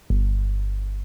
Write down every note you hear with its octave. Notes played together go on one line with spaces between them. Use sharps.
G1